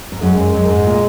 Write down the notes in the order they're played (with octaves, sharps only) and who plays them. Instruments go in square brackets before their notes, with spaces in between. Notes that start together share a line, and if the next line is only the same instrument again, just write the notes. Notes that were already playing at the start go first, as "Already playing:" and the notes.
[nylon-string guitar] G#2
[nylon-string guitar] F#2 [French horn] G#3
[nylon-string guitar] F#2
F#2
G#2
A#2